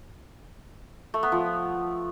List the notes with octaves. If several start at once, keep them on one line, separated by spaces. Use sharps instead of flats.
A3
B3
F3